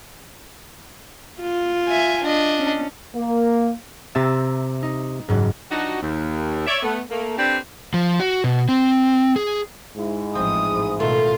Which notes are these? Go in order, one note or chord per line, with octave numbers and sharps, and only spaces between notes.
F4
E5 G#5
D4 D#5
C#4
A#3
C3 E5 A#5 E6 A6
D#4
F#1 G#2 F#3
F3 D4 D#4 F#4
D#2
C#5 D5 E5
A3 B3
A3 A#3
C4 D4 G4 A4 B4 D5
F3
F#4
B2
C4
G#4
G#2 G#3 E4
A1 F3 C4 D#6
A1 B2 D#3 A3 F4